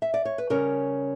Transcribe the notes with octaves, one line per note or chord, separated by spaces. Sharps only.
E5
D5
C#5
B4
C#3 G3 C#4 A#4